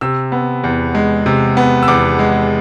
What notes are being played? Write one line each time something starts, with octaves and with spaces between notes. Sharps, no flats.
C3 E6
B3
E2
G#3
C3
B3
E6
E2 D6
G#3